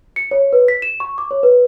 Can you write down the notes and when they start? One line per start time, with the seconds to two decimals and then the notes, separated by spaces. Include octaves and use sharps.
0.16 C#7
0.31 C#5
0.53 B4
0.68 B6
0.82 E7
1.00 C#6
1.18 D6
1.31 C#5
1.43 B4